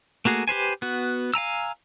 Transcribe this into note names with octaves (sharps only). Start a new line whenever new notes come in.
A3 A#3 F#4 G#4
G4 B4 C5 G#5
B3 F#4
F5 G#5 A#5 E6